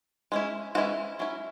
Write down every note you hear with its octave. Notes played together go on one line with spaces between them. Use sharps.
G#3 C#4 E4
E3 G#3 C#4 E4 F#4
F#3 C#4 E4